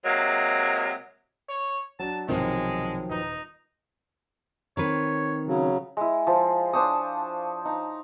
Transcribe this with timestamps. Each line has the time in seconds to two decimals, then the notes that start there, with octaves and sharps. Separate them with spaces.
0.05 C3 F#3 G#3 A#3
1.49 C#5
1.99 F#3 D4 A5
2.28 B1 C3 D#3 F3 F#3 G#3
3.10 D#1 D#4 B4 A#5
4.77 D#3 C4 B4 C#5
5.47 C#3 F#3
5.97 G#3 E4
6.27 F3
6.73 D4 C5 C#5 D#6
7.65 D#4